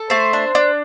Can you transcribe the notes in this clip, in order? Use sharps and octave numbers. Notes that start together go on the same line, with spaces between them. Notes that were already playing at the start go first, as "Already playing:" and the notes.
Already playing: A4
A3 C5
D4
D4